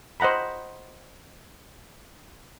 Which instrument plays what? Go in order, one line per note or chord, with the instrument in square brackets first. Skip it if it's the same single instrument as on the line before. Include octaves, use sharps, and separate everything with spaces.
[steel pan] C5 D#5 F#5 A#5 B5